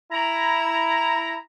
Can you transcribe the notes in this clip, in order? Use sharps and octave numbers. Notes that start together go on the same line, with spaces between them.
E4 A#5